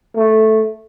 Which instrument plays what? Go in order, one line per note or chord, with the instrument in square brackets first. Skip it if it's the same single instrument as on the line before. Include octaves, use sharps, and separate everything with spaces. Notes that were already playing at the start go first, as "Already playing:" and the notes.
[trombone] A3